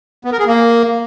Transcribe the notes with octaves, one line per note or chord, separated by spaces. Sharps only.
B3
A#4
G#4
A#3